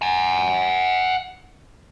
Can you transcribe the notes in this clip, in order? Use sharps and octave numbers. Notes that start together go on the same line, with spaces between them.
F#5 G#5